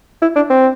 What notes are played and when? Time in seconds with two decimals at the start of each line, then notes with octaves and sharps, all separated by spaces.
0.22 E4
0.36 D4
0.50 C4